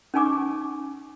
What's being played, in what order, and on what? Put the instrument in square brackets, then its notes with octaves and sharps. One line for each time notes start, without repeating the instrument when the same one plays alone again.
[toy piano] C#4 D#4 G#5 C#6 D6